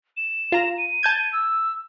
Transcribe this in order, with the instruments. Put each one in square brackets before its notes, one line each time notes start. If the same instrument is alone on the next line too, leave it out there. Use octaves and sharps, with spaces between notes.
[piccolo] E7
[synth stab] F4 A#5
[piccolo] D#7
[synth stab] A5 G6 G#6
[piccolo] E6